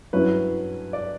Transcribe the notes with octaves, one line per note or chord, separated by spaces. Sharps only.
G2 F#3 C#4 E4 B4
D5